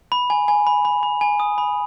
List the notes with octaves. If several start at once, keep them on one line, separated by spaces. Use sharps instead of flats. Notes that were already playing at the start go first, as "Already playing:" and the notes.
B5
G#5
G#5
B5
B5
B5
G#5
D#6
B5